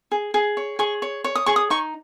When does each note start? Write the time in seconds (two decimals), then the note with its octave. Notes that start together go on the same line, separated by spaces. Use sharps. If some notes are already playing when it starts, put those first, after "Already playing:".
0.12 G#4
0.34 G#4
0.57 C#5
0.79 G#4 C#6
1.02 C#5
1.24 C#5
1.35 D#6
1.46 G#4 C#6
1.56 D#6
1.70 D#4 C#6